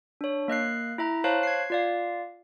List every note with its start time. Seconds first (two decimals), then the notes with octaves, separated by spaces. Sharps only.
0.21 D4 C#5
0.48 A#3 D#5 F#6 C7
0.98 E4 E5 A#5
1.24 C5 C#5 F5 A5 F#6
1.43 G#6 C7
1.70 F4 D5 F5